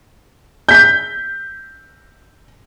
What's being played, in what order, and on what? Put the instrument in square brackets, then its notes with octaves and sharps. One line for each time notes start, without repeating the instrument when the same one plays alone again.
[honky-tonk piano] G6 B6